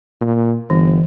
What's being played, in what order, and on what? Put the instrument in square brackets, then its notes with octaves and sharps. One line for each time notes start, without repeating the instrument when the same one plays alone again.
[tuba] A#2
[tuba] G1 [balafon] E3